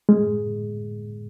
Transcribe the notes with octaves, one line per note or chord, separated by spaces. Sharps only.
G#3